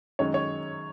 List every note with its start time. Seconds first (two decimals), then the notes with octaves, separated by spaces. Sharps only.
0.19 F#2 D#3 G#3 C#5
0.34 C#5